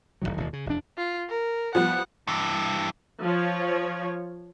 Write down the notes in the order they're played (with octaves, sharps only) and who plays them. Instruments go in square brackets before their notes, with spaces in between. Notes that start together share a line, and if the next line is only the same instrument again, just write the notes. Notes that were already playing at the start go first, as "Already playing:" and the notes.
[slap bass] D1 C#2 D#3 F#3
E1 D#2
C#3
E1 F2 D4
[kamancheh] F4
A#4
[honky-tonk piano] F3 G3 B3 [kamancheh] F#5
[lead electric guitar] G2 E3
[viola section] F3 C#5